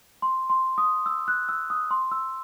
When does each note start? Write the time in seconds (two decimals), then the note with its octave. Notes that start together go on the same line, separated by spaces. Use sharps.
0.22 C6
0.50 C6
0.78 D#6
1.06 E6
1.28 F#6
1.49 E6
1.70 D#6
1.91 C6
2.12 E6